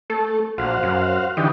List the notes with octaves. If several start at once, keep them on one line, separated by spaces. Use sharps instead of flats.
A3 A4
A#1 F#4 C5 F5
F#2
D3 E3 D#4 G4